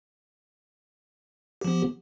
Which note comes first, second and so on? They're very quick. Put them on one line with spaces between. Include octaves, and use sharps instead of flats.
G4 F3 B3